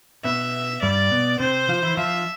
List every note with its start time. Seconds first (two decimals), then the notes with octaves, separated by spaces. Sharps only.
0.24 B2 B3 E5
0.82 G2 G3 D5
1.11 B2 B3
1.40 C3 C4 C5
1.69 F3 F4
1.83 E3 E4
1.97 F3 F4 E5